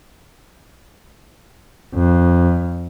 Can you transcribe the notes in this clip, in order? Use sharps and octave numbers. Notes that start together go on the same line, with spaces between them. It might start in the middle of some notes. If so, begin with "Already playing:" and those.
F2